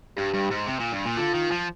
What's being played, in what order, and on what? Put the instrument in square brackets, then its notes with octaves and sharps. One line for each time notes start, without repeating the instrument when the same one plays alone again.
[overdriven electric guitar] G2 [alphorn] G4
[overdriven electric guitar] G2
G#2
C3
A#2
G2
A#2
[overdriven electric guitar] D3 [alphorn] F4
[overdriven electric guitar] D#3
F3